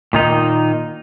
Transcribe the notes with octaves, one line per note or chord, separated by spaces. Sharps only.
A#2 D#3 D#4